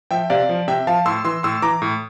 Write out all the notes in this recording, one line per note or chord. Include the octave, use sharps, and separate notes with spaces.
F3 E5 G5
C3 D5 F5
F3
C3 E5 G5
F3 F5 A5
A2 C6 E6
E3 C6 E6
A2 C6 E6
E3 A#5 D6
A2